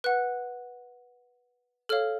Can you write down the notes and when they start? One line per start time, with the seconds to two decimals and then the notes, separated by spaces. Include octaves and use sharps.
0.04 B4 F#5 F#6
1.89 A4 C#5 F5 F6